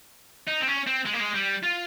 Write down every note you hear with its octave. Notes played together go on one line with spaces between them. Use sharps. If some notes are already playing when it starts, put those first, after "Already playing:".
D#4
C4
C#4
C4
G#3
A#3
G#3
G3
F4